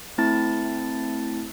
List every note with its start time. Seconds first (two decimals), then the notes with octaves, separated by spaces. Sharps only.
0.18 A3 C4 E4 A5 A6